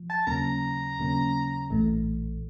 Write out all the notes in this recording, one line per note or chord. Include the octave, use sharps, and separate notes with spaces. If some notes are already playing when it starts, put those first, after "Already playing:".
Already playing: F3
A5
D#2 C#3 F#3 A#3 C#4 A#5
D#2 C#3 F#3 A#3 C#4
A#1 A2 E3 A3